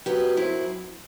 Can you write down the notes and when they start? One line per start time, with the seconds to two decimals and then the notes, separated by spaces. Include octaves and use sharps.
0.06 F#3 G4 B4
0.37 F#2 C4 E4